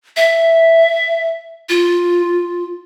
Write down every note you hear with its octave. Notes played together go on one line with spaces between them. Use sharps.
E5
F4